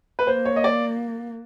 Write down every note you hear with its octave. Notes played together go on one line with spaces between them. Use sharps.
B4
A#3 C5
C#5
D#5
D5